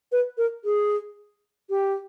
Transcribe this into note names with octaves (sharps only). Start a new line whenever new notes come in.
B4
A#4
G#4
G4